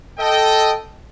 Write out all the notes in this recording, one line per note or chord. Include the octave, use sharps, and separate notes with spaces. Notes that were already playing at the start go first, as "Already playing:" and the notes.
A4 D#5 G5